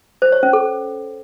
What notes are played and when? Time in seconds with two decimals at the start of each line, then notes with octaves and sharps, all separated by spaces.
0.22 C5
0.32 C#5
0.43 C#4
0.53 A4